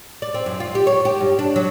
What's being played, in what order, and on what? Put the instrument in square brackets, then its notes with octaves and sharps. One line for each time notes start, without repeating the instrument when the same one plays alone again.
[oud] D5
C4
F#2
F4
G4
C#5
G4
G2
D4
F#3